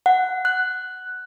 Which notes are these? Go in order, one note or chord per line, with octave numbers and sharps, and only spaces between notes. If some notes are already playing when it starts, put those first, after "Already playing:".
F#5
F#6